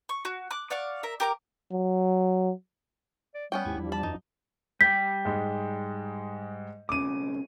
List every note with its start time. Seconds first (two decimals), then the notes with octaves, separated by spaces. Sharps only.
0.09 C#6
0.25 F#4
0.51 D6 F#6
0.70 D5 F5 F#5 C#6
1.03 A#4 E5
1.20 G4 A#4 D6
1.72 F#3
3.35 D5
3.52 G3 B3 C#4 G5
3.65 D#2 G#2 E4 G4 G#5
3.77 E2 F3 G3 D4
3.92 A5 B5
4.03 F#2 D#4
4.81 G3 G5 G6 B6
5.25 G#2 G#3
6.89 B1 C#3 D6 D#7